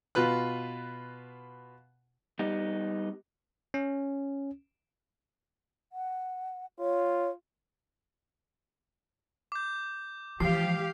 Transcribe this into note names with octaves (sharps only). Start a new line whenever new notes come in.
B2 F4 B4 F#6
G3 B3 D#4
C#4
F#5
F4 C#5
D6 G6
E3 F3 G#3 G4 F5 C7